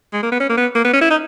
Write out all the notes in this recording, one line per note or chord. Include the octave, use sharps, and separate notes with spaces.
G#3
A#3
B3
C#4
A#3
B3
A#3
B3
C#4
E4
D#4